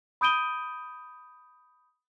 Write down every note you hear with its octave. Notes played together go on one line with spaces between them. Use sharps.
B5 D#6 G6 D7 D#7 G7